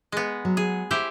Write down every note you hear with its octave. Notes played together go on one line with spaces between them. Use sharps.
G#3 B3
F#3
G#4
E4 G4 G#4 C5